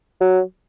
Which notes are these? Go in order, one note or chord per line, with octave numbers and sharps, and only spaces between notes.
F#3